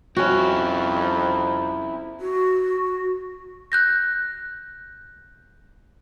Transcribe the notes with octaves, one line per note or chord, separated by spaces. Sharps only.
F2 C4 C#4 E4 F#4
F#4
F#6 G6 A#6